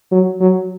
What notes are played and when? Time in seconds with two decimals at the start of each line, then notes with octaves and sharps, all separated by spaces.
0.12 F#3
0.41 F#3